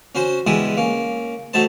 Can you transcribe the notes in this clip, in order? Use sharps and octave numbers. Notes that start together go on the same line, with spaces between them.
C#4 F#4 C5 C6
E2 G3 G#3 E4 G#5 D#6
A#3 C#4
F#3 A3 D#4 C5 A5